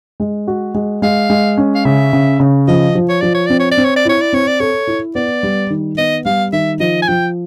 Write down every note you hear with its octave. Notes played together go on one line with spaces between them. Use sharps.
G#3
F#4
G#3
G#3 F5
G#3
C#4
F5
C#3 E5
C#3
C#3
F3 D#5
F3
C#5
F3 D5
C#5
C4 D5
C#5
D5
C4
C#5
D5
E4 C#5
D5
C4 C#5
D5
A4 C#5
E4
B3 D5
G3
D#3
B3 D#5
G3 F5
D#3 E5
F3 D#5
G#5
F3 G5